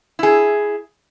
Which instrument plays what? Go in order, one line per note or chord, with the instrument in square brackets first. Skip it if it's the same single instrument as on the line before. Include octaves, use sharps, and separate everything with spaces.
[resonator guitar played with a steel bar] E4 G#4